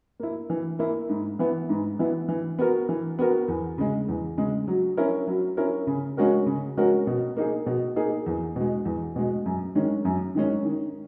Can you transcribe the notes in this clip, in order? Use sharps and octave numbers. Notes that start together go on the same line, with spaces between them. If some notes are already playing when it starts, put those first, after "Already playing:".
A#3 E4
E3
A#3 E4
G#2
E3 B3 E4
G#2
E3 B3 E4
E3
B3 F#4 A#4
E3
B3 F#4 A#4
E2
C#3 G#3
E2
C#3 G#3
F#3
C#4 E4 A#4
F#3
C#4 E4 A#4
C#3
G#3 C#4 F#4 A#4
C#3
G#3 C#4 F#4 A#4
B2
A#3 D#4 G#4
B2
A#3 D#4 G#4
E2
B2 G#3
E2
B2 G#3
F#2
D#3 G#3 C#4
F#2
D#3 G#3 C#4
D#3